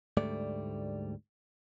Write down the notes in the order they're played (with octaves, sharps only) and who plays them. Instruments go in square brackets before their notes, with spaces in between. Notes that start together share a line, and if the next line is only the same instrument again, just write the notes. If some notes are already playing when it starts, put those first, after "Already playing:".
[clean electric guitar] D2 G#2 G3 A3 D5